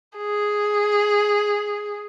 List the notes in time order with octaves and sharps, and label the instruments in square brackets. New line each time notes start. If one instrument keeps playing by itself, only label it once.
[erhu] G#4